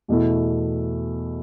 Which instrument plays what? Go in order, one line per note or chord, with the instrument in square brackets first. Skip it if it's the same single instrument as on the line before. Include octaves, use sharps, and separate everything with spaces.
[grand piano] E2 B2 A3 E4